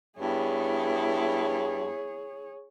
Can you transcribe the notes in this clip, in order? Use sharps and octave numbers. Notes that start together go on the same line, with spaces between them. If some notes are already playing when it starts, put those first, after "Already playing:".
G2 B3 E4 G#4 C#5